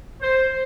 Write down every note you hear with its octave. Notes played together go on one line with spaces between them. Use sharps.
C5